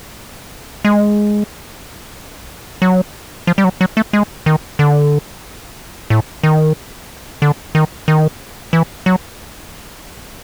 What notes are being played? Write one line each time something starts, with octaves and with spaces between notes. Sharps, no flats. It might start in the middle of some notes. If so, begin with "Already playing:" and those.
G#3
F#3
F3
G3
F#3
F#3
A3
G#3
D#3
D3
A2
D#3
D3
D#3
D#3
E3
F#3